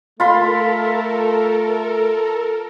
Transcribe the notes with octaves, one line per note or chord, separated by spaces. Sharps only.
A3 F4 A4 A#4 B5 C6